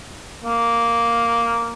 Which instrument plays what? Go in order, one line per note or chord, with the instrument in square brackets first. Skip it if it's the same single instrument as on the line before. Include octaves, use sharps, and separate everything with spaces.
[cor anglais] A#3